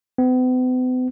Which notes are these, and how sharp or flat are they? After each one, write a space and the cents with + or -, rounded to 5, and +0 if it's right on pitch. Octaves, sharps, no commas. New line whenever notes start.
B3 +45